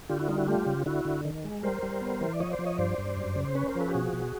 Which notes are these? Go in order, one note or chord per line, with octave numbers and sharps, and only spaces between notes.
D3 F4 G4
E4 F#4
G3 D#4 F4
E4 F#4
A3 F4 G4
C#3
D3 E4 F#4
D3
D#3
G#3
G3 A#4 C5
G3
B3
E3
D5
F3 C#5 D#5
C5 D5
F3
C#5 D#5
G2 C5 D5
G2
F#2
C#3
C5
C#4 B4 C#5
A#4 C5
F3
A4 B4
G4
B2 F#4 G#4
B2